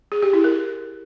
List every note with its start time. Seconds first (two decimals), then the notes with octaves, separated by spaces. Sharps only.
0.12 G#4
0.23 G4
0.33 E4
0.44 A#4